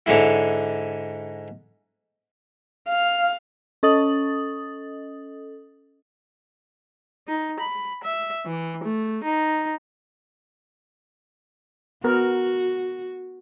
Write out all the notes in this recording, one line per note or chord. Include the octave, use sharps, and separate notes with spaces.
G#2 D3 G#3 E4
F5
C#4 A4 D#5 D#6 A6 F#7
D#4
B5
E5
E3
A3
D#4
B3 F#4 A#4